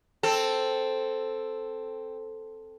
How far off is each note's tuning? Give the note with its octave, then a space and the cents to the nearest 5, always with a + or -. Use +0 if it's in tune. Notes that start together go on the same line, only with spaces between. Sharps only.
C4 +0 A4 +0